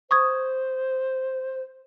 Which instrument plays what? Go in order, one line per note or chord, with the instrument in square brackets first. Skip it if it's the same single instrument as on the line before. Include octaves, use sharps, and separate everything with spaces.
[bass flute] C5 [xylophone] C#6 D#6 G#6